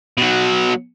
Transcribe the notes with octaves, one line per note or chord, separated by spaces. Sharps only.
B2 F#3